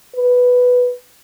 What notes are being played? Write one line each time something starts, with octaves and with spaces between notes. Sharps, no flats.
B4